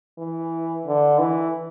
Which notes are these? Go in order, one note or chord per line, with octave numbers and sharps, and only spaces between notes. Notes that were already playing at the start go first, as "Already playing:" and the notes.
E3
D3
E3